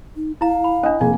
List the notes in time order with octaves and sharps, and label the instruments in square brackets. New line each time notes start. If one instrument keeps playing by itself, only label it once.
[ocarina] D#4
[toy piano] E4 A#5 [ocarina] F5
[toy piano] B5
[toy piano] C#4 D4 [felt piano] D#5
[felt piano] F1 A#3 G#5 [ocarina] G#4